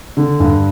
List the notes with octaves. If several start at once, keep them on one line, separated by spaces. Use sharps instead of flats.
D3
G2